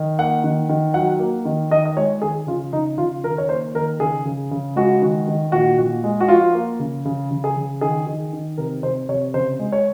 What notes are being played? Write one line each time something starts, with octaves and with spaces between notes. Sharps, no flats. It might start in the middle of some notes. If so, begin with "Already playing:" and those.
Already playing: D#3
A#3 F#5
D#3
D#3
F#3 F#5
A#3
D#3
D#3 D#5
D#5
G#3 C#5
D#3 G#4
C#3 F4
C#3 D#4
C#3 F4
D#3 A#4
C#5
A#3 C5
D#3 A#4
C#3 G#4
C#3
C#3
G#3 F#4
D#3
D#3
A#2 F#4
A#2
G#3
F#4
F3 F4
A#3
C#3
C#3
C#3
G#4
C#3
D#3 G#4
D#3
D#3
C3 A#4
C3 C5
C3 C#5
C#3 C5
G#3
C#5